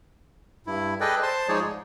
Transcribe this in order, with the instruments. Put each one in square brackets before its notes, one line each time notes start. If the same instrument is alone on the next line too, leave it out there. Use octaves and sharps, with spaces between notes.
[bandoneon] G2 E4
G#4 A4 B4 D5 D#5 G5
C5 A5 C6
F3 G#3 D#4 G#4 C#5 D5
G#2